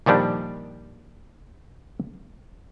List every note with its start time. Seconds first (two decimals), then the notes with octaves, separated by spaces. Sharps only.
0.06 A#2 D#3 F3 G3 D4